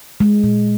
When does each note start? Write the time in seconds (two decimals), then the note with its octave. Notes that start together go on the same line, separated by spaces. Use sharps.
0.20 G#3
0.43 A#2